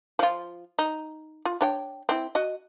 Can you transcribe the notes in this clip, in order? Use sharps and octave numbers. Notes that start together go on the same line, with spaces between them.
F3 F4
D#4
F4
D4 C#5 G5
C4 E4
F#4 D#5